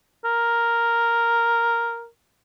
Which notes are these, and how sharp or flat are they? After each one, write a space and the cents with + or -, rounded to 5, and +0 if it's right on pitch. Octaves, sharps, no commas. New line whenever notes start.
A#4 +0